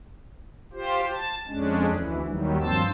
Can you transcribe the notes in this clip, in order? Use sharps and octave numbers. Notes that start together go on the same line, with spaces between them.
F4 G4 C5
A5
F2 G#3 C#4 D4
D2 E3
D#2 D#3 F#3 G3
G2 F3 C4 C5 A5 E6